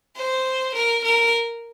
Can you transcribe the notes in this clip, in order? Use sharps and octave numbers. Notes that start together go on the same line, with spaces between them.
C5
A#4
A#4